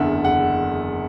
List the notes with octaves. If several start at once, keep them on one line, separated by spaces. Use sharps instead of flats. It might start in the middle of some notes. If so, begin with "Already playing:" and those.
Already playing: F#1 E2 D3 E5 F#5
F#1 F#5